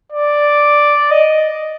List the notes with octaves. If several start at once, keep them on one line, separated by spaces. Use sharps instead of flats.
D5
D#5